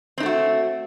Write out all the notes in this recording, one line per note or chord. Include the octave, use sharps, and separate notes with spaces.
A3 C4 D#4 F#4